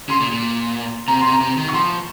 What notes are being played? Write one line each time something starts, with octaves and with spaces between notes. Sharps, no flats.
C#3 C6
A#2
A#2
C3 A#5
C3 C6
A#5
C3
D#3
C#6
F3 C6